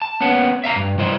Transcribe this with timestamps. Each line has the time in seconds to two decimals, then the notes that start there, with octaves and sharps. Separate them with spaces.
0.02 A5
0.20 A#3 B3 C#4 F#5
0.64 E5 F5 A#5
0.76 G2
0.98 G3 E4 C5 D#5